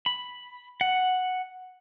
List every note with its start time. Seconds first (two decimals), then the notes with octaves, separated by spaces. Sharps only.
0.06 B5
0.81 F#5